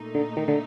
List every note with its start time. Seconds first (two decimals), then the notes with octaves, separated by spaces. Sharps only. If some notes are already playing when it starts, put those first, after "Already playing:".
Already playing: A#2 A3 D#4
0.15 D3
0.37 D#3
0.48 D3